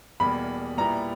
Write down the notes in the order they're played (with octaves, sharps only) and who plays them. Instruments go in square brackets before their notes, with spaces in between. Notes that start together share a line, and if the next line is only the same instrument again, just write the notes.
[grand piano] E2 B2 G3 A#3 [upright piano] B5
[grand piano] A#2 G3 B3 E4 [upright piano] A#5